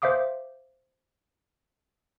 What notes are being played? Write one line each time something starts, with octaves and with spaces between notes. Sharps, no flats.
C5 E5 F5 D6 D#6